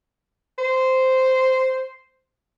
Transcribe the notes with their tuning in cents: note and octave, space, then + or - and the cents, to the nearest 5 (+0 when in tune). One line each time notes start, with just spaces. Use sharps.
C5 -10